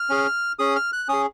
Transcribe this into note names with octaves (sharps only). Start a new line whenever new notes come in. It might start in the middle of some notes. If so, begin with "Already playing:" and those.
Already playing: F6
C#4 G#4
C#4 G#4 D#6
F6
F#6
C#4 G#4 D#6